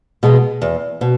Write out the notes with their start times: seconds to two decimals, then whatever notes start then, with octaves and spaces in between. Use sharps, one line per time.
0.23 B2 G#3 B3
0.62 E2
1.01 B2